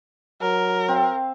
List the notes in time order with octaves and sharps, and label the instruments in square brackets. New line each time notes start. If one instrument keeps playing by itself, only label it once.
[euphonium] F#3 [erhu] A#4
[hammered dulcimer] C4 F5